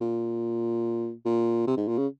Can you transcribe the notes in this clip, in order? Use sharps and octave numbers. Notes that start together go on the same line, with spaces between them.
A#2
A#2
C3
G#2
A#2
C#3